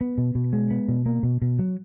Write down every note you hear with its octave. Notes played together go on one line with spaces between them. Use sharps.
B3
B2
B2
G#3
B3
B2
A#3
B2
B2
F#3